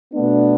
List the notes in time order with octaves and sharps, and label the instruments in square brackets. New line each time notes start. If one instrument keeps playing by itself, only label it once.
[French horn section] B2 A3 B3 D4